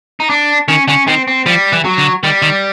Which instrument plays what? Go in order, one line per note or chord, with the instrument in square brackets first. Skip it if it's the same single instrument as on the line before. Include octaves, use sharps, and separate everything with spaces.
[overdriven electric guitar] D#4
D4
[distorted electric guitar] D#3 [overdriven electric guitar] C#4
[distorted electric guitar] D3 [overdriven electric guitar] C#4
[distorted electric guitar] D#3 [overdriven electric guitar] C4
[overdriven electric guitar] C4
[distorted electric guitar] F3 [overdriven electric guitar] G3
[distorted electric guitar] E3
[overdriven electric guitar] F#3
[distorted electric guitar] D3
[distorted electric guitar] D#3 [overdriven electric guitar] G3
[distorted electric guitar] D#3